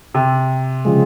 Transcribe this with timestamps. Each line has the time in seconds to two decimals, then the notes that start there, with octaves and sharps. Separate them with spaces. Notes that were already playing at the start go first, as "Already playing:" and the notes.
0.14 C3
0.85 C#3 F3 G#3